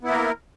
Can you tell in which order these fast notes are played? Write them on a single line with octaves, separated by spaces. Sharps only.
B3 E4 A#3 A#4